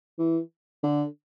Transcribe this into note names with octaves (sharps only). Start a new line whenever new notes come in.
E3
D3